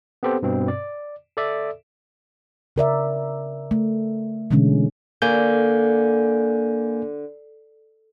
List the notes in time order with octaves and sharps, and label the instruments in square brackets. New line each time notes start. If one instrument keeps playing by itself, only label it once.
[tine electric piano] B3 C4 G4 A4 C5
G2 B2 C4
D5
A4 D5 E5
[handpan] C#3 A#4 D5 E5
A3
B2 D3 E3 G#3 C#4
[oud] D3 [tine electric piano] A#3 G#5 G6